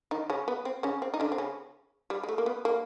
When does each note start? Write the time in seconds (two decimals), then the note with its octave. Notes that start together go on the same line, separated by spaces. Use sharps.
0.11 D#3 D#4
0.30 C#3 C#4
0.48 B3
0.65 C4
0.83 C#3 C#4
1.02 C4
1.14 D#4
1.20 D3 D4
1.32 C4
1.38 C#3 C#4
2.10 G3
2.23 G#3
2.29 A3
2.38 A#3
2.46 B3
2.65 A#3